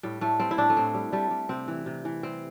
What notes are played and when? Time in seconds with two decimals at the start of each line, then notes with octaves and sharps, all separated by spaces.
0.03 A2 G3
0.21 A2 A3
0.39 G3 C4
0.51 E4
0.58 A2 D4
0.70 A3
0.77 A2 C4
0.94 G3
1.12 G3 A3
1.31 G3
1.49 C3 C4
1.68 E3
1.86 C3
2.05 E3
2.23 G3 C4